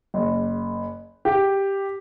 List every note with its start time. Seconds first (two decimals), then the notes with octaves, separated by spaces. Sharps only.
0.14 F#1
1.25 G4